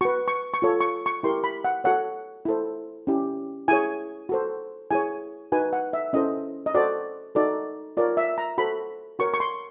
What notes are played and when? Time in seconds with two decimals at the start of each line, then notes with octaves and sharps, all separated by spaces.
0.01 F#4 B4 C#6
0.28 C#6
0.54 C#6
0.62 F4 A4 C#5
0.81 C#6
1.06 C#6
1.23 E4 G4 A#4 C6
1.44 B5
1.65 F#5
1.84 F#4 A4 C#5 F#5
2.45 E4 A4 C5
3.07 C#4 E4 G4
3.68 E4 G#4 C#5 G#5
4.29 F#4 A4 C5
4.91 E4 G#4 C#5 G#5
5.52 D#4 F#4 B4 G#5
5.73 F#5
5.93 E5
6.13 C#4 E4 A4 C5 D#5
6.66 D#5
6.75 F#4 A4 C5 D5
7.35 D#4 F#4 A4 D5
7.97 F4 A#4 C#5 D5
8.17 E5
8.38 A#5
8.58 F#4 A4 C5 B5
9.19 F#4 A#4 C#5 C#6
9.34 C#6
9.40 C6